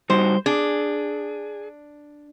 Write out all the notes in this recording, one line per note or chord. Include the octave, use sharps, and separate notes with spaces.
G3 D#4 F#4 C5
D4 G#4